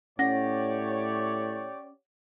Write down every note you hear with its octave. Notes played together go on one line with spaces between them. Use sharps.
A2 C#4 G4 C#5 D5 F#5 A#6